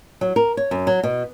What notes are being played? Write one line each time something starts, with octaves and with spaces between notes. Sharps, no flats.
F#3
A#4
C#5
F#2
F#3
B2